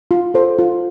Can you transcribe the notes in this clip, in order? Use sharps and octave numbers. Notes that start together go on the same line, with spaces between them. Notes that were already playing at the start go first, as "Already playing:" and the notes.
F4
A4 C5
F4